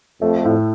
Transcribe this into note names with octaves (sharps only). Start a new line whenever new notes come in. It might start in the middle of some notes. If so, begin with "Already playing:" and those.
F2 A3
A2